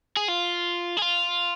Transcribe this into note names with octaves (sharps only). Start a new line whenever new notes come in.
G#4
F4
G#4
F4